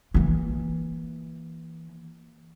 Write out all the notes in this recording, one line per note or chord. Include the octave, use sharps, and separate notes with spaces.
E3 A#3